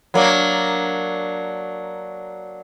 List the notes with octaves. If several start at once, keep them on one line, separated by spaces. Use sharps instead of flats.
F#3 A#3 D4